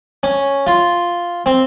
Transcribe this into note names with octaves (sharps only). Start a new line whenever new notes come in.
C#4
F4
C4